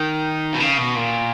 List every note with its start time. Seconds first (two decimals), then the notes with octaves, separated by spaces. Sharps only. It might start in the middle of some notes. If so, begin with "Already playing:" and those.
Already playing: D#3
0.54 B2
0.60 C#3
0.78 B2
0.96 A#2